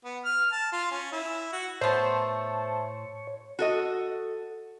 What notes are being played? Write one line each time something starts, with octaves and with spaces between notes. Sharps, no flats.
B3
F6
A5
F4
C#4
E4
F#4
A2 A3 B3 C5 C#5 A5
F#4 A4 D#5